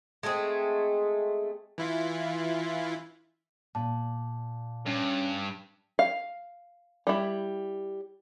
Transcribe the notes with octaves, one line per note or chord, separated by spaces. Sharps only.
G#3 A3 C4 G#4
E3 E4 F4
A#2 A5
G2 C#4
F5
G3 E4